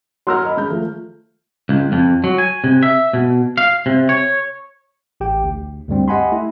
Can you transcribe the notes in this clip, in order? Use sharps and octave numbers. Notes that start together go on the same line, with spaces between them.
F#3 A#4 C6 E6 F6
D#5 B5
G#3 G6
F3 A3
C#2
F2
F#3
G#5
C3
E5
B2
F5
C3
C#5
A1 G4 G5
D2
D2 G2 G3 C4
G4 D#5 F#5 G#5 B5 C6
A3 E4